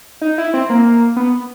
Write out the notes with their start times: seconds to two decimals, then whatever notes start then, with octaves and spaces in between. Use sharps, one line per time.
0.22 D#4
0.38 E4
0.54 C4
0.70 A#3
1.16 B3